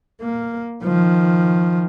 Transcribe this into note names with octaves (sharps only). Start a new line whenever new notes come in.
A#3
D#3 F3